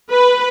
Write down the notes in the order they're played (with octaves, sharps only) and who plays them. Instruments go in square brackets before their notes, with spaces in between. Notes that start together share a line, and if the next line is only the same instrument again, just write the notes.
[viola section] B4